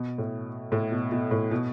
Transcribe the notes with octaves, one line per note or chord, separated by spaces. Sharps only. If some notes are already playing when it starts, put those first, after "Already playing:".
Already playing: B2
A2
A2
B2
B2
A2
B2